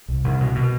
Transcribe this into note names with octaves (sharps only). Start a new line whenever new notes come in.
C2
C2
B2
B2